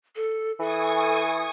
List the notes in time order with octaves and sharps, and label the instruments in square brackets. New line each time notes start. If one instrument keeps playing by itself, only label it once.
[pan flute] A4
[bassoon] E3 [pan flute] A4 [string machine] G#5 C#6 D#6